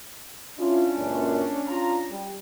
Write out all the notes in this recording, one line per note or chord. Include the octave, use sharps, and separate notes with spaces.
C#4 D4 E4 F4
C#2 F#2 A#2
F4 A#5
G3